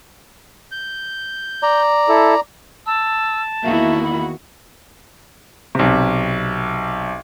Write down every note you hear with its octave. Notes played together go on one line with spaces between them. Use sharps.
G6
D5 A#5
E4 A4
A5 E6
E2 D#3 A#3 E4 F#4 E5
B5
B1 C3